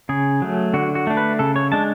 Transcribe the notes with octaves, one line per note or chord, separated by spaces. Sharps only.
C#3 G#4
F#3 A3
D3 F#4
F#4
A3 D4
B4
C#3 A4
C#5
G#3 D4 A5